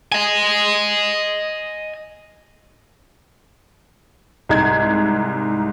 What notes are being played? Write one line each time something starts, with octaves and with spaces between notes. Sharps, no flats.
D#5 G#5
C2 G#2 G#3 G#6